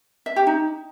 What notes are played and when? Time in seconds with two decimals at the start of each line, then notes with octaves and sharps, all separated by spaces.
0.26 E5
0.36 G4
0.47 D#4